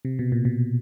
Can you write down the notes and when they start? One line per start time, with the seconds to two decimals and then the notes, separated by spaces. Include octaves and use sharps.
0.05 C3
0.19 B2
0.32 A#2
0.45 B2